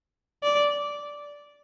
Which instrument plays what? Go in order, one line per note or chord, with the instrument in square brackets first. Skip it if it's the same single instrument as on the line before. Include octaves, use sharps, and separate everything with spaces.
[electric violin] D5